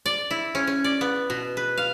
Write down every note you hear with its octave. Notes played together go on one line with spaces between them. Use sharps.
D5
E4
C#4
C#4
D5
B3
B2
B4
F5